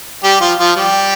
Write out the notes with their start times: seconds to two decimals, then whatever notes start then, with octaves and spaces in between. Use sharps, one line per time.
0.24 G3 G4
0.41 F3 F4
0.59 F3 F4
0.76 G3 G4